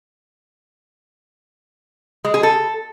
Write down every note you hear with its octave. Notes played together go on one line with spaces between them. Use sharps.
G#3
G#4
A4